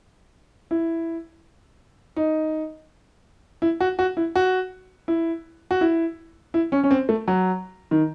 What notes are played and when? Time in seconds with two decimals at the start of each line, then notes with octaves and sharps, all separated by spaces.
0.71 E4
2.16 D#4
3.62 E4
3.80 F#4
3.99 F#4
4.17 E4
4.35 F#4
5.08 E4
5.71 F#4
5.81 E4
6.54 E4
6.72 C#4
6.84 C#4
6.91 C4
7.09 A3
7.28 F#3
7.91 D#3